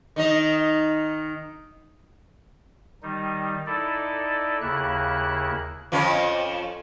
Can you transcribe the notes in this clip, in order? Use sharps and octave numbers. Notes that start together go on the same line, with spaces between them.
D#3 D#4 D#5
D#3 G3 D#4
D#4 E4 A4 D5
D#2 C#3 A#3 E4 F#6
F2 F3 C#4